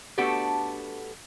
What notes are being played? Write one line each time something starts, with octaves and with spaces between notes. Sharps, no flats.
A3 B3 D4 F#4 G4 A4